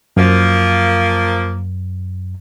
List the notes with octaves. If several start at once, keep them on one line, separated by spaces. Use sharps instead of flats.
F#2 F3 A#3